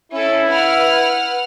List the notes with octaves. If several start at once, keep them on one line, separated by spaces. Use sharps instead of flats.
C#4 E4 A4
B4 F#5 F6